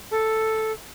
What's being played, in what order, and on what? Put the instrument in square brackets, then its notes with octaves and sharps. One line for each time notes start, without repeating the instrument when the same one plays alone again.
[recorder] A4